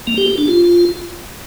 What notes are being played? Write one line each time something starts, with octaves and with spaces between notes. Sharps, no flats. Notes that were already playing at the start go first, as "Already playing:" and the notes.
A#3
G4
G4
D4
F4